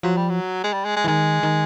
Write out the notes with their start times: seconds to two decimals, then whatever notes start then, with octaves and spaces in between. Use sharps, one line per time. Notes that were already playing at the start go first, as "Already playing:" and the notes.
0.03 F3 F#3
0.17 G3
0.29 F#3
0.64 G#3
0.73 G3
0.85 G#3
0.96 G#3
1.04 E3
1.08 D#3 G#3
1.43 D#3